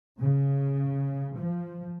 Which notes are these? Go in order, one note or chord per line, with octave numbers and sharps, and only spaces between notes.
C#3
F3